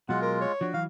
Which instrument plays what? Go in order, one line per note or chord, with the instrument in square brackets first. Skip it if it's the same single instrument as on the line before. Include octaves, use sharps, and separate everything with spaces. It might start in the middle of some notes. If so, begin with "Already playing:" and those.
[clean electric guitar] B2 F#3 [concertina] G#3 F4 [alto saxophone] F#5
[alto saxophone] A#4
C#5
[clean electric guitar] F3 D4 [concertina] F#4
[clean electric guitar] E3 F#3 [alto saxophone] F5